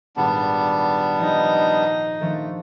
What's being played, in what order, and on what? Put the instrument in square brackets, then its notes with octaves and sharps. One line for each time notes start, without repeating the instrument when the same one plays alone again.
[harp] G#1 A#2 [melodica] G3 B3 D4
[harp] F3 [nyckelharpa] D#4
[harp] D#3 F3 D4 [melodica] A3